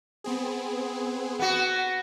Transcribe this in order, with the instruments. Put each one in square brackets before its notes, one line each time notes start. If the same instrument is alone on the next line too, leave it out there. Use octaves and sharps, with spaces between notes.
[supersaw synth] B3 C4 G#4
[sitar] B3 F#4